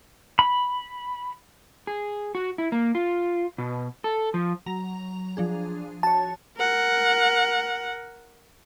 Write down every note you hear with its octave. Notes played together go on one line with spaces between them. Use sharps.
B5
G#4
F#4
E4
A#3
F4
B2
A4
F3
F#3 A#5 F7
F3 D4 G#4
F#4 C#5 A5
A#4 F#5